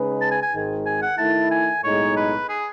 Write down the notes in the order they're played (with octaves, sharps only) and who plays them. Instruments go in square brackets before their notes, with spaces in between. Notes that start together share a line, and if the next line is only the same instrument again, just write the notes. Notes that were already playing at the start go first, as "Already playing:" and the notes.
Already playing: [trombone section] C#3 G#3 D#4 G#4 B4
[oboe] A5
G#5
G#5
[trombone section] G#1 G#2 D#3 G#3
[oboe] G#5
F#5
[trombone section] D#3 A3 E4 [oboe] A5
[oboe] G#5
[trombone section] B1 A2 G#3 D#4 [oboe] C#5
[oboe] B4
G#4